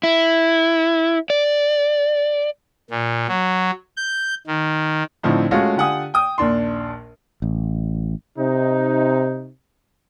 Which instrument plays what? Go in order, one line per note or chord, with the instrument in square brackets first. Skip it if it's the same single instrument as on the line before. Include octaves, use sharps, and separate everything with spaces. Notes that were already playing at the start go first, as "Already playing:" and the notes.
[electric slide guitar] E4
D5
[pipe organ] A#2
F#3
G6
D#3
[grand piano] A2 D3 F3 C4 D#4
G#3 A3 C#4 F4 F#4
D3 F4 G4 F#5 G#5 D#6
G5 D#6
A#1 D#2 D4 C6
[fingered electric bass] A1
[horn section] C3 D#4